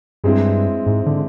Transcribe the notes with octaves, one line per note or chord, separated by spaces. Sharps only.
G2 G#3 C4 E4
G#2
D3